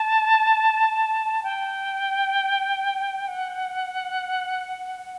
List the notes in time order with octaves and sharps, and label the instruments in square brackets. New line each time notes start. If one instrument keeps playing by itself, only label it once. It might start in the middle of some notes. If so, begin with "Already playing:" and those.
Already playing: [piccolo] A5
G5
F#5